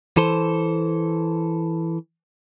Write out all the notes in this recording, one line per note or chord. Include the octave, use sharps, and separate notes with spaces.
E3 A4 C5